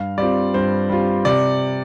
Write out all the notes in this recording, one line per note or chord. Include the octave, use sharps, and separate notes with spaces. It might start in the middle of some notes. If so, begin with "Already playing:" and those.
Already playing: G2 F5
G3 C4 F4 D5
G2 C5
G3 C4 F4
C3 D5